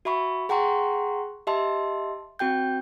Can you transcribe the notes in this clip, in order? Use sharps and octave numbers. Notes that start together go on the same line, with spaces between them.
F#4 E5 B5 C#6
G#4 F#5 G5 A#5 C6 C#6
G4 D#5 E5 A5 C6
C4 F#4 G5 G6